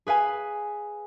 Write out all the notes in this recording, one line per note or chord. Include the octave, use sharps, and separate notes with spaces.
G#4 B4 F5 G#5